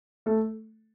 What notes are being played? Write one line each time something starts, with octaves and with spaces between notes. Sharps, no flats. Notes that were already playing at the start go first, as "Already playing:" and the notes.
A3 A4